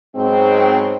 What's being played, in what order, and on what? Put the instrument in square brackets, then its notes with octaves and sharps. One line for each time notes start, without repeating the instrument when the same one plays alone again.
[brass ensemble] G#2 B2 F#3 G#3 C4